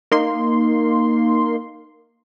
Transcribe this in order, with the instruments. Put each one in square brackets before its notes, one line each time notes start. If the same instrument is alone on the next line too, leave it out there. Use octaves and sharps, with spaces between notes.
[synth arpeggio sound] A#3 D#4 C6